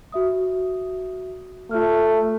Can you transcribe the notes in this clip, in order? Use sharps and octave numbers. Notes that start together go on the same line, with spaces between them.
F#4 E5 D#6
A3 F4 F6